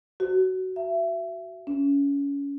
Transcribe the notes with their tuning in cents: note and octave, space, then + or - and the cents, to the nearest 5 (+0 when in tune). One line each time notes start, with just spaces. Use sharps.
F#4 +15
E5 +25
C#4 +25